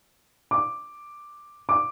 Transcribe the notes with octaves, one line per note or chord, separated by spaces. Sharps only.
D6
D6